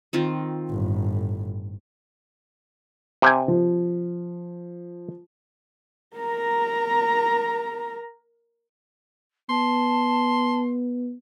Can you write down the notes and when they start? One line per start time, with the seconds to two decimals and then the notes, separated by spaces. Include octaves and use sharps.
0.13 D#3 C4 F4
0.70 G1 A2
3.22 C3 G5 G#5
3.48 F3
6.16 A#4 A#5
9.49 B3 A5 C6